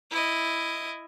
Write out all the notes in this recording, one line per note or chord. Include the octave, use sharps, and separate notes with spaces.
E4 D#5